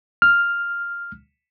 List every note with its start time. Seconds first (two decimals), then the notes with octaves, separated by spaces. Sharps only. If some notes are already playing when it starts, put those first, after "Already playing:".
0.22 F6